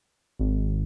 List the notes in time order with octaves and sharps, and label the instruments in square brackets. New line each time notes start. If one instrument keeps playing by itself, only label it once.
[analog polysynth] G#1